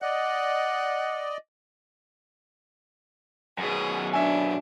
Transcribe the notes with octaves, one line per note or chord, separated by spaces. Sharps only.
D5 D#5 F#5
F#2 B2 G#4
D4 E5 G#5